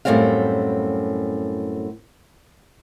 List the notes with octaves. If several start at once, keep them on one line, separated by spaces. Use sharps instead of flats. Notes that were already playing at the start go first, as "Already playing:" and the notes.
F#2 A2 C3 G3 C4 F5